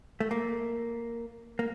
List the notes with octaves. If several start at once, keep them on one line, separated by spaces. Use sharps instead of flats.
A3
A#3
A#3